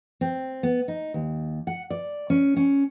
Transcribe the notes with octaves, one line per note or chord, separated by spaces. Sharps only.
C4
B3
D#4
D#2
F#5
D5
C#4
C#4